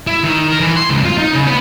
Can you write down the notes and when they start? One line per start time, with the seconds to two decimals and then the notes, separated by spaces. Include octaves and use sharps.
0.07 E4
0.24 D#3
0.48 A#4
0.60 E3
0.77 C6
0.90 C#2
1.05 F4
1.18 D#4
1.34 C#3
1.47 B3